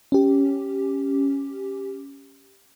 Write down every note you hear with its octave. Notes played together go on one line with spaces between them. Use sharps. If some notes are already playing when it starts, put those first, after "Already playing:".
C#4 G4